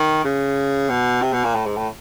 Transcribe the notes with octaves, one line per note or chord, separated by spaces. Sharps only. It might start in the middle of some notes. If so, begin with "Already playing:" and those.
Already playing: D#3
C#3
B2
C3
B2
A#2
A2
G#2
A2